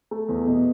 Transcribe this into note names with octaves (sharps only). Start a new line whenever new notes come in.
A3
E2
B2